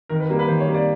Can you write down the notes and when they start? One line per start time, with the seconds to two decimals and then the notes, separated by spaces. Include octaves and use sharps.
0.09 D#3 A#4
0.20 B4
0.29 G3 A#3 A#4
0.39 B4
0.48 D#3 C5
0.60 C#5
0.68 G3 A#3
0.74 D5